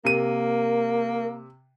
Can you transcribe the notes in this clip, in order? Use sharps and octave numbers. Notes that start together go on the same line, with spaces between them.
C3 A#3 A#4 D#7